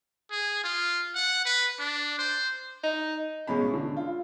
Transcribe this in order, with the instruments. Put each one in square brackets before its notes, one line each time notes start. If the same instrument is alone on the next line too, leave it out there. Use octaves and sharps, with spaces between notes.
[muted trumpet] G#4
F4
F#5
B4
D4
C5
[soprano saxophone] D#4
[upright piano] A1 B2 G#3 C#4 B5
D3
F4